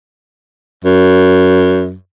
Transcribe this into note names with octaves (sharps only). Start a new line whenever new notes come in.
F#2